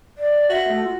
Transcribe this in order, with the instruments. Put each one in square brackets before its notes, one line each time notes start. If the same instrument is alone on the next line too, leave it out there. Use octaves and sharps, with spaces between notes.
[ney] D5
[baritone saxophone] F#4 [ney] E5
[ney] A3
F4